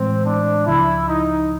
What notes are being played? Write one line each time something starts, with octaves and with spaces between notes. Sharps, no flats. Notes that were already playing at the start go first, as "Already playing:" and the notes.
Already playing: A2 E3 G#3 C4
D4
C#2 C#3 F3 E4
D#4